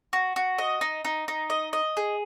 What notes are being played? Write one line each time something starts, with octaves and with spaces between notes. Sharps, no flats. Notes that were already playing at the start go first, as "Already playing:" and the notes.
F#4
F#4
D#5
D#4
D#4
D#4
D#5
D#5
G#4